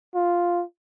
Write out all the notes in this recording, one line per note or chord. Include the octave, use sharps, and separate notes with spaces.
F4